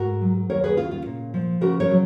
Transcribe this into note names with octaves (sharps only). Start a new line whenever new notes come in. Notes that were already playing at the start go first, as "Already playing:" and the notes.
Already playing: G#2 F#4 A#4
F#3
D#2 A#4 C#5
G#4 B4
C#3 F4
F4
A#2
F3
C#3 F#4 A#4
A#4 C#5
F#3